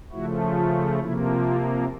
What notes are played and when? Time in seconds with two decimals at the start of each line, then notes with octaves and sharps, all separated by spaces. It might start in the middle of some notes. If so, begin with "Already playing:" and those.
0.12 C#3 F3 A3 E4 F#4
0.57 F4
1.00 C3 F3 A#3 E4
1.43 F4